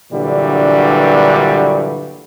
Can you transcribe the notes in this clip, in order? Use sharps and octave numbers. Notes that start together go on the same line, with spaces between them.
G2 A#2 D3 E3 F#3 G3